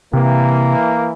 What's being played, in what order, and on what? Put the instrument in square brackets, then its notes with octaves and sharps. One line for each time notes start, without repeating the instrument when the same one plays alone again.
[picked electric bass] C3 [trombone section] E3 A#3